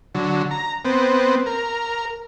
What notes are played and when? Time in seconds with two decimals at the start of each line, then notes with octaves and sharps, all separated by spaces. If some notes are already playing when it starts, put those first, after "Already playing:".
0.15 D3 F#3
0.51 A#5
0.85 B3 C4
1.46 A#4